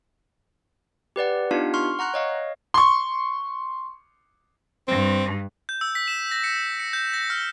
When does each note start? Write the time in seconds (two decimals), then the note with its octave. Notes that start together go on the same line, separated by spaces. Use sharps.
1.16 G4 B4 D5 F#5
1.51 B3 D4 D#4 F4 G4 F5
1.74 C6 C#6 F6
1.99 F#5 A#5 C#6 F#6
2.14 C#5 D#5 F5
2.74 C6 C#6
4.88 G2 C4
5.69 G6
5.81 E6
5.95 B6
6.08 E7
6.31 A#6
6.44 C#7
6.80 C#7
6.93 G6
7.14 A#6
7.30 F6